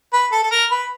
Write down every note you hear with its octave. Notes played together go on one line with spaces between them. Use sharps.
B4
A4
A4
A#4
B4